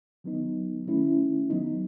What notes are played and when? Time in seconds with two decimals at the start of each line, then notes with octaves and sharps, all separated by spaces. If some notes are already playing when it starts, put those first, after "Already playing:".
0.24 D#3 F#3 B3 D#4
0.87 D#3 A3 C#4 E4
1.50 F#3 B3 D#4